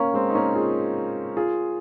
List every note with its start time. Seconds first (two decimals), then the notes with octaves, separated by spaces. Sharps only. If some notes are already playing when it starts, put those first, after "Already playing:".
Already playing: A#3 C#4 A#4 C#5 F5 A#5 C#6
0.14 G#3 C4
0.30 D#4
0.35 A#3 C#4
0.55 F4 G#4
1.37 F4 G#4